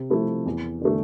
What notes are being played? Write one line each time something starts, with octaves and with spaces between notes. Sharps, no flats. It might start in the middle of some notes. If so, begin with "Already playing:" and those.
Already playing: C3
F3 A3 E4
E2
D3 A3